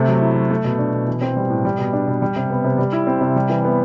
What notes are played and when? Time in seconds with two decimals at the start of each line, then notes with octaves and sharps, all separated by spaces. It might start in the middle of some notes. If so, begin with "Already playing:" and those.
Already playing: C3 A3
0.08 F#3
0.21 E4
0.36 F#3
0.51 A3
0.64 B2
0.79 D4
0.93 B2
1.07 E3
1.21 C4
1.37 G3
1.50 A2
1.65 G3
1.78 B2
1.93 D4
2.07 B2
2.22 G3
2.36 C3
2.50 B3
2.64 C3
2.78 G3
2.93 E4
3.07 C4
3.21 C3
3.36 G3
3.50 E3
3.64 B3